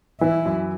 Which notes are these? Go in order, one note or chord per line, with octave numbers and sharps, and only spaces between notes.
E3 E4
F#2